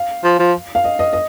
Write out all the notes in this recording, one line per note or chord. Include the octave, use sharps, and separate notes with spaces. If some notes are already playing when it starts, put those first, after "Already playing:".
Already playing: F5
F3
F3
F5
D#5
D#5
D#5